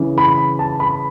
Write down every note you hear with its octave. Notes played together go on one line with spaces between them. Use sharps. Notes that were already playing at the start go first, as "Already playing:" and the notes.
Already playing: C#3 E3
B5
A5
B5